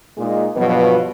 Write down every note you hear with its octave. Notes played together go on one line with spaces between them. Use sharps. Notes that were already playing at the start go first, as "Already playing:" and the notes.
A#2 G#3 D#4 G#4
G2 B2 F3 F#3 B3 B4